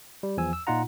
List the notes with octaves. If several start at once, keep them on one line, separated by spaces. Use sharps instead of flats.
G3
E2 F3 G#5 E6
E6
A#2 D#4 F4 F#5 A#5